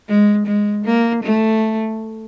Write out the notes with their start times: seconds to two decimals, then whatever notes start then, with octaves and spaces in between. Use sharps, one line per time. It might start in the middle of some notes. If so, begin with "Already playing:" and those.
0.08 G#3
0.47 G#3
0.85 A#3
1.23 A3